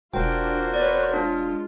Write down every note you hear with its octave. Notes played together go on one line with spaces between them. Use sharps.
E1 D4 F4 F#4 A#4 C5 G5
C4 B4 C#5 D5
G#3 D4 F4